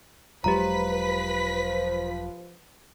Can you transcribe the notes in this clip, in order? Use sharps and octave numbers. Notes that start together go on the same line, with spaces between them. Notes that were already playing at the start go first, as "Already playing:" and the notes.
E1 F3 F#3 G#3 G4 B4 A#5 B6